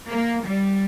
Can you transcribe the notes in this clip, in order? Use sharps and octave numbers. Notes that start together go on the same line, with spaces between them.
A#3
G3